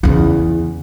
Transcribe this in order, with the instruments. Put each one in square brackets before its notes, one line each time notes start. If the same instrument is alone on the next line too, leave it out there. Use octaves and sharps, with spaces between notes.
[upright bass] E2 C#3